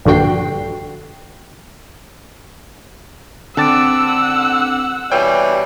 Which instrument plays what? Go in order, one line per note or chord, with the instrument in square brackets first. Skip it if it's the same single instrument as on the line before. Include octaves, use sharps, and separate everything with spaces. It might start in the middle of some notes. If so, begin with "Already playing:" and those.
[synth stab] A#1 G2 D3 F#4 G5 C7
[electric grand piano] D3 A5 A6 [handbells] C4 D6 D7 [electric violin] F#5 E6
[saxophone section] B2 E3 G3 [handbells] C#5 [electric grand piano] G5